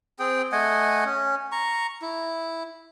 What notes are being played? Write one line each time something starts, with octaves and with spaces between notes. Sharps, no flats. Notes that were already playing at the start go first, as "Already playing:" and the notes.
C4 G#4 G5
A3 D#5 F#5 G#5
C#4
A#5 C#6
E4